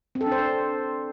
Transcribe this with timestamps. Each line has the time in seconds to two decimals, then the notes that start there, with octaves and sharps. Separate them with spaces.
0.15 C4
0.21 A4
0.26 D4
0.32 C5